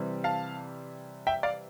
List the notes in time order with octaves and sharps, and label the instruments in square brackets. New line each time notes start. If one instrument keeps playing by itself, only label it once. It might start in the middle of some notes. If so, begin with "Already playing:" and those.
Already playing: [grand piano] C3 E3 G3 C4
F5 A5
E5 G5
D5 F5